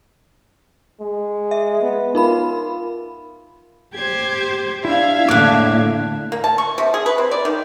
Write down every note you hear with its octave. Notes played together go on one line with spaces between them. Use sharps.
G#3
E5
B3
D#4 F4 A#4 B5
G4 C5 G#6
D4 E4 E5 F5 G#6
E2 A2 D3 A#3 D6 F#6
A#3
A5
C#6
C3
G#4
B4
C4
D5
D#3